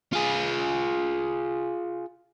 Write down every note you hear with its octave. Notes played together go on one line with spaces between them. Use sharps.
F4 G#4